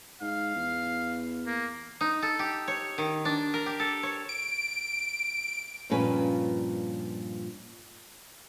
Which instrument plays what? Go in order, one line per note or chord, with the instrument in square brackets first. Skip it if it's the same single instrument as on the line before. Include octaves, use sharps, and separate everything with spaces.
[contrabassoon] G#2 [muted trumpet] F5
[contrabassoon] E2
[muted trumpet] A#3
[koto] D#4
A4
G4
C#5
D#3
D4
A#4
G4
A4
C#5
[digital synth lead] D7
[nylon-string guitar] G2 A#2 F3 C#4 B4 G#5